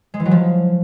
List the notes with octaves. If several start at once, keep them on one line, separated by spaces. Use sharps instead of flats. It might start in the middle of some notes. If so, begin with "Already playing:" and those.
G#3
E3
F#3
F3